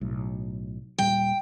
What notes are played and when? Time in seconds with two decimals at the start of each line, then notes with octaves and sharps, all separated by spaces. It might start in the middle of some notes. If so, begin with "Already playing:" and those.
0.01 B1 A2
0.99 D#1 A#2 G3 G5